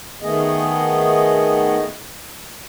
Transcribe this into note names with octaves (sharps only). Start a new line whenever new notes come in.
D#3 A3 B3 G#4 D#5